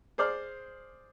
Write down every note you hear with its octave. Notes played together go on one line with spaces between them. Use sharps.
G#4 C5 D5 D6 F6